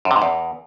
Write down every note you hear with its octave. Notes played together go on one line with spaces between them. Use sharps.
F#2
C3
G#2
E2